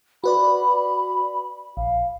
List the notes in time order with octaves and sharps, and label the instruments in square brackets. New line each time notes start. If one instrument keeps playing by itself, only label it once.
[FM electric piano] F#4 B4 D5 [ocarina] B5
[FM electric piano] A#1 [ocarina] F5